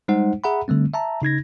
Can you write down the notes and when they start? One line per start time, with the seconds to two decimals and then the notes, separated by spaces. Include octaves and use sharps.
0.08 G3 G#3 D#4 C5 F#5
0.44 G#4 E5 F#5 A#5 B5
0.68 D3 G3 A3 C4
0.94 E5 A5 A#5
1.22 C#3 D#4 G#6 A#6